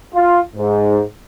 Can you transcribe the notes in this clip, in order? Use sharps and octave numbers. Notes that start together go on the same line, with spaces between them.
F4
G#2